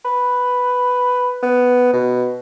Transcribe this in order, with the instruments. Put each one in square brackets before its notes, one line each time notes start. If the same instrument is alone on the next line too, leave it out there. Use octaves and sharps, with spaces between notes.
[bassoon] B4
B3
B2